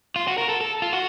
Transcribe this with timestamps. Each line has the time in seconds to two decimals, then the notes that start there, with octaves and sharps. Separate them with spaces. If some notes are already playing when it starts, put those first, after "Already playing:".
0.16 F4
0.28 F#4
0.38 A#4
0.49 A4
0.61 A4
0.82 F4
0.93 F#4